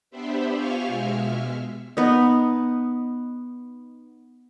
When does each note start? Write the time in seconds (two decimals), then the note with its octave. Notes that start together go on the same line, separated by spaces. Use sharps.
0.10 B3 D4 G4 B4 C5 E5
0.54 F4 G4 F5 G#5 C#6 F6
0.87 B2 G#3 E5 F6
1.97 B3 D#4